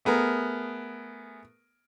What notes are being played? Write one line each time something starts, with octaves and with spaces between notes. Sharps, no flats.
A3 B3 G#4 A#4